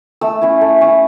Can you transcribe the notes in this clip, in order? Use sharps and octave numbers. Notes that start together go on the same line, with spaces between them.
A3 E6
C#4 E4
A3
C#4 E4